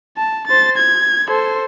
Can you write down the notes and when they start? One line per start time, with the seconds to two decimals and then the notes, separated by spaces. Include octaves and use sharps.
0.17 A5
0.47 C5 A6
0.77 G#6
1.29 A4 C5